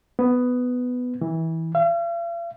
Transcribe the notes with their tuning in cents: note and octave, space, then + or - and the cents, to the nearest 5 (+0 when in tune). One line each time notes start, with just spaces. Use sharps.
B3 +10
E3 -25
F5 -45